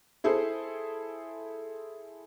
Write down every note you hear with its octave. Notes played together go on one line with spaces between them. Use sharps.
E4 G#4 A4 C5